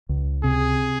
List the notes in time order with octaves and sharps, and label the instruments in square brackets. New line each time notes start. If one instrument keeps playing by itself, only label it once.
[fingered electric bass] C#2
[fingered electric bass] C3 [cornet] G#4